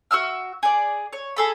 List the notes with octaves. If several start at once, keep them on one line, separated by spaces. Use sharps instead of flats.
F#4 E5 E6 F6
G#4 D5
C#5
G#4 A4 B5